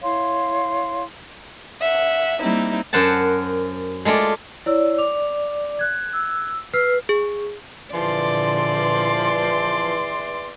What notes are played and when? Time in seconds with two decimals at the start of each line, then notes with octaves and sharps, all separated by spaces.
0.02 E4 C#5 F5 C6
1.80 E5 F#5
2.40 G3 A#3 C4 D#4 E4
2.93 F#2 A#4 C5 F#5 A5
4.05 G#3 A3 F4 D5
4.66 E4 C#5 D5 E6
4.98 D6 F7
5.79 F#6 G#6
6.13 E6
6.73 B4 E6 F6 C7
7.09 G#4
7.94 E2 A#2 D3 E3 F3 D5 C6